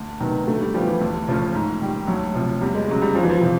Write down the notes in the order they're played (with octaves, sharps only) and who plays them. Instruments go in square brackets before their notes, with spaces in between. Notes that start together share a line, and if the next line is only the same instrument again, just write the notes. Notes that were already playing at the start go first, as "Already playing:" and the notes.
Already playing: [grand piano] D2
C3 D#3 F#3 B3
[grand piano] D3 [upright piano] A3
[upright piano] G3
[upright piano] F3 [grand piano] G3 B3
[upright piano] E3
[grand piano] D2
C#3 F3 A3 C#4
G#2
D#3 G3
[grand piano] D2 [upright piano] F#3
[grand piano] C3 F3
[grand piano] E2 [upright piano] G3
[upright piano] G#3
[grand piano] C#3 F#3 [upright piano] G#3
[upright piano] G3
[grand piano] F2 [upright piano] F3
[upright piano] E3
F3
[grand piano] C3 E3